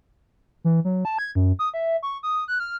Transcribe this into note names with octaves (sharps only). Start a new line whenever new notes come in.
E3
F#3
A5
G#6
F#2
D#6
E5
C#6
D#6
F#6
F6